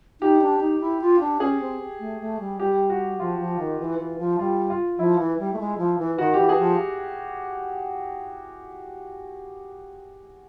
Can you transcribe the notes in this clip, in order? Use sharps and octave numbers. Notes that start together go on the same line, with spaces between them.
D#4 G4
D4
D#4
E4
F4
D4
C#4 G#4
C4
A3
A3
G3
G3 G4
F#4
F3 F4
F3
D#3
E3
E3
F3
G3 F4
F4
F3 E4
E3
G3
A3
G#3
F3
E3
D#3 F#4
E3 G4
G#4
F3